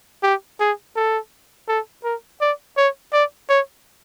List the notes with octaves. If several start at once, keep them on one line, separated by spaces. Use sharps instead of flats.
G4
G#4
A4
A4
A#4
D5
C#5
D5
C#5